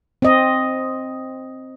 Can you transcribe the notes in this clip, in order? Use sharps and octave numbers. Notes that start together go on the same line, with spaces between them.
C4 D#5